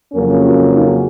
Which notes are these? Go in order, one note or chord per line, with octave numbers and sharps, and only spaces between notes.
F2 C#3 F#3 A#3 C#4 A#4
F4
D#4